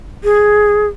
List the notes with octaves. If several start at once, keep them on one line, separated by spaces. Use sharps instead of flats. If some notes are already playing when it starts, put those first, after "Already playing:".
G#4